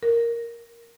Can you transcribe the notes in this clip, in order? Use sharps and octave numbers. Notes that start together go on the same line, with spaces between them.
A#4